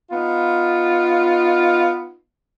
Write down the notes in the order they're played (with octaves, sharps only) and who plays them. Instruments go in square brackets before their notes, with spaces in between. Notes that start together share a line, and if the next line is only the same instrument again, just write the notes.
[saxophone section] B3 D#4 F4